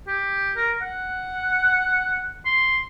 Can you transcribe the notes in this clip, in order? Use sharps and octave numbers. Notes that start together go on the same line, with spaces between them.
G4
A#4
F#5
C6